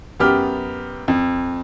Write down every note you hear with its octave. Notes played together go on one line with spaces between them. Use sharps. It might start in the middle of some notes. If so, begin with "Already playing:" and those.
F#2 B3 G4 F6
F2